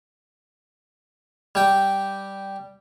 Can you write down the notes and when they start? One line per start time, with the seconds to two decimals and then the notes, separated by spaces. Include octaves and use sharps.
1.55 G3 G5